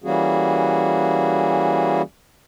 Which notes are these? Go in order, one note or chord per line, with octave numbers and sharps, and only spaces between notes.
E3 G3 A#3 C#4 F#4 G#4